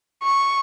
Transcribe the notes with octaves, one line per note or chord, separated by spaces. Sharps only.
C#6